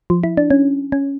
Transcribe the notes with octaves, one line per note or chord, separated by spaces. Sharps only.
F3
E4
D4
C#4
C#4